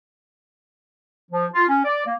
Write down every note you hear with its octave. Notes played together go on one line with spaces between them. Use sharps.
F3
F4
C#4
D5
A#3